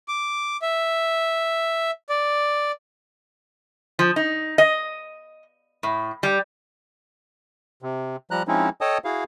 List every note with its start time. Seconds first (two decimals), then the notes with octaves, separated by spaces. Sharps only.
0.08 D6
0.62 E5
2.09 D5
3.99 F3
4.16 D#4
4.58 D#5
5.83 A2
6.23 G3
7.82 C3
8.31 F3 G3 A#5 F#6
8.48 F3 G#3 C4 C#4 D#4 E4
8.81 A4 C#5 D#5 G5 A5 D#6
9.05 E4 F#4 G#4 F5